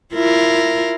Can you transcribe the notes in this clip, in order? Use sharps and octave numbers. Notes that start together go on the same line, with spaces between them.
E4 F4 A#4